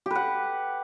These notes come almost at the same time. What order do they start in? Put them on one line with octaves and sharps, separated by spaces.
G4 B4 F#5